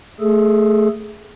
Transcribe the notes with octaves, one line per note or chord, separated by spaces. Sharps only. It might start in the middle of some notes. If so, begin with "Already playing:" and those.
A3 G#4 A4